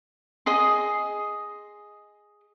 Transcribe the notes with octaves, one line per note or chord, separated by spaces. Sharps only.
G#4 D#5 C6